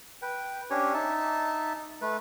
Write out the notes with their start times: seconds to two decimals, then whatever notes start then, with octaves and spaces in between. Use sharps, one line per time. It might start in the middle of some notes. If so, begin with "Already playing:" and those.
0.22 B4 G5
0.70 C#4 D4 G4 C#5
0.94 D#4 E5 A5
2.02 A3 B4